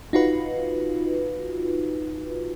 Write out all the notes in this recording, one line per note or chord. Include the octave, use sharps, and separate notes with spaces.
D#4 F4 F#4 B4